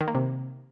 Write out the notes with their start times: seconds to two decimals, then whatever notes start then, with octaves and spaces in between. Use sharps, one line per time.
0.01 D#3
0.08 A#3
0.15 C3